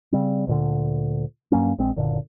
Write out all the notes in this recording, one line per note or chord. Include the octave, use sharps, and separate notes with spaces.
C#3 G3 C4
D2 A#2 D3
G2 F#3 A#3 C#4
A#1 G#3 C4
F#1 A#2 D3